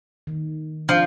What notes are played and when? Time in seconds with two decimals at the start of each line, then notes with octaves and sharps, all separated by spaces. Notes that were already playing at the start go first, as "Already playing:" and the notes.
0.27 D#3
0.89 F3 D4